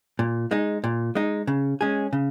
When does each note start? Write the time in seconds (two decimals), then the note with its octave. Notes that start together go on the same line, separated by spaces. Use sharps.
0.19 A#2
0.51 G#3 D#4
0.84 A#2
1.15 G#3 D#4
1.47 C#3
1.81 G#3 C#4 G#4
2.13 C#3